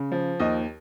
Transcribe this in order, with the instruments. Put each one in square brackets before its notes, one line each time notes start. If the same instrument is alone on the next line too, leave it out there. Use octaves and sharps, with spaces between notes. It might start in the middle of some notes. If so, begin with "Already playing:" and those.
Already playing: [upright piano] C#3
F3
D#2 D#5